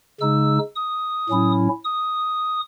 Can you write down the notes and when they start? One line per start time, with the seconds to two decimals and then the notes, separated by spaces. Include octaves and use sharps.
0.20 C#3 G#3 D#4 E6
0.76 D#6
1.29 A2 F#3 C#4 E4
1.84 D#6